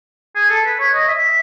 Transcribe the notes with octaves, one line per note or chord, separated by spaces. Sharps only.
G#4
A4
B4
C#5
D#5
E5